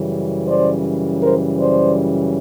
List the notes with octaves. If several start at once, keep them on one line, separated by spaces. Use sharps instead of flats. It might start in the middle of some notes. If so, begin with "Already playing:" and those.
Already playing: F#2 C#3 E3 G3
C5 D5
A#4 C5
C5 D5